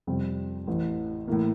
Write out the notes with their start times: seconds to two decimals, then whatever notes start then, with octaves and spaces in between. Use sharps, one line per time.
0.07 F2 C3 G3 C4
0.67 A1 A2 E3
1.28 A2 E3 A#3